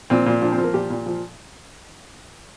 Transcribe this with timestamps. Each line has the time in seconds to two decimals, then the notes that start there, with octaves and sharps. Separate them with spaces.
0.10 A#2 C4
0.26 A#2
0.41 F3 D4
0.52 C4
0.58 F3
0.64 A#3
0.74 A#2 G4
0.90 A#2
1.06 F3